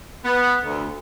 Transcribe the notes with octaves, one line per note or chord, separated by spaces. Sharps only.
B3
D2